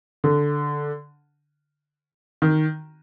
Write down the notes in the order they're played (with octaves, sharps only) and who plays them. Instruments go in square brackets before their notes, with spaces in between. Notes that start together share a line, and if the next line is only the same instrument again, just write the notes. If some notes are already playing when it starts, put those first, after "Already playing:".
[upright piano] D3
D#3